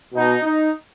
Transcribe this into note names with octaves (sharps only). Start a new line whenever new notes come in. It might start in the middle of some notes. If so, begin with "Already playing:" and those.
B2 D#4
D#4